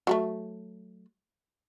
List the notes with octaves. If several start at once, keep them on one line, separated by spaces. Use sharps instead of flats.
F#3 G3 A3